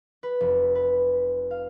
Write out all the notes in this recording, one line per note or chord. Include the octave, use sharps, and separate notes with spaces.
B4
F1
B4
F5